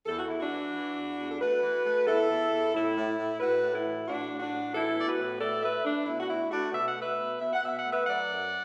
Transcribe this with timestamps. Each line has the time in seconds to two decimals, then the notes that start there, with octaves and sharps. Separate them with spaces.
0.06 E2 A4
0.18 F#4
0.29 E2 E4
0.40 D4 F#4
0.51 E3
0.73 E3
0.96 E2
1.17 E2
1.31 A4
1.40 A3 F#4 B4
1.62 E3
1.84 A3
2.06 E2 E4 A4
2.29 E2
2.51 E2
2.74 A2 E4
2.96 A2
3.18 A2
3.40 A2 F#4 B4
3.62 A2
3.73 E4 A4
3.85 E3
4.07 A2 D4 F#4
4.29 A2
4.40 D4 F#4
4.51 A2
4.73 E3 E4 A4
4.96 B3 D5
5.06 F#4 B4
5.18 A2
5.40 A3 A4 D5
5.63 A3 B4 E5
5.84 A3 D4
6.06 B2 E4
6.20 F#4
6.28 A3 E4
6.51 A3 D4 F#4
6.73 B2 E5
6.88 F#5
6.95 A3
7.01 B4 E5
7.18 B2
7.40 B2 E5
7.53 F#5
7.62 B2 E5
7.79 F#5
7.84 A3
7.92 B4 E5
8.07 F#3 D5 F#5
8.28 F#2